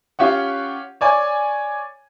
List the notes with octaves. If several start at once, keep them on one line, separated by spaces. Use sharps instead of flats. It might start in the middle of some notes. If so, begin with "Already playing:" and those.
C#4 F4 G4 C#5 F#5
C#5 D5 G#5